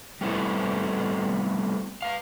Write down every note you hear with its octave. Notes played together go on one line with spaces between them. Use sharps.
G3 A3 B3 C4 E4 A4
B4 F5